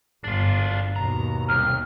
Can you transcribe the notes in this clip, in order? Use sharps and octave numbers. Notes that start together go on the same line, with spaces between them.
G1 D4 F4
D#2 B2 A#5
C2 F6